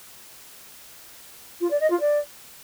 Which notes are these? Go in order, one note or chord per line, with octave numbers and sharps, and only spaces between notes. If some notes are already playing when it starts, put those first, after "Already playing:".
F4
D5
D#5
F4
D5